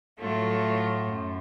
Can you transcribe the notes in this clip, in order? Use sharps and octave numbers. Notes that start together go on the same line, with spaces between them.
A2 F#3 A3 F4
F#2